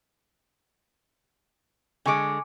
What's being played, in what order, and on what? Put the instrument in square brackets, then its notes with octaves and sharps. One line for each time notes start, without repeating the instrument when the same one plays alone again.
[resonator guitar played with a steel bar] D3 G#3 [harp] G#5 C#6 D6